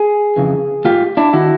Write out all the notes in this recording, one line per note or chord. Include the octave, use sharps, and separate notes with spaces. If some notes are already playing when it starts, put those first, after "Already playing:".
Already playing: G#4
F2 C#3 E3
G#2 D#3 F4 G4
D4 E4
D#3 E4 F#4